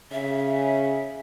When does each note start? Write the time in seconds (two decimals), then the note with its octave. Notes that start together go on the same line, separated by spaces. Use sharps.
0.12 C#3 E5